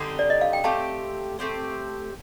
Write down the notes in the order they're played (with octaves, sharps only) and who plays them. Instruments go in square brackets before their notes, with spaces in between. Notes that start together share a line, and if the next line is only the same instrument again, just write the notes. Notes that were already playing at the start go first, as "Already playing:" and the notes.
Already playing: [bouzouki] D3 G3 C4 D#4
[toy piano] D5
D#5
F5
G5
[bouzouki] A3 C4 G4 C5 [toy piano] F5 A5
[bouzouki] A3 C4 G4 C5